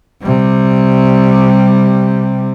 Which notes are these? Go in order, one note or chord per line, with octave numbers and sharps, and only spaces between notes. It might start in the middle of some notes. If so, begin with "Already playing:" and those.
C3 G3